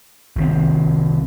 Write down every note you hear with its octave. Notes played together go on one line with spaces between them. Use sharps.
C2 D#3 C4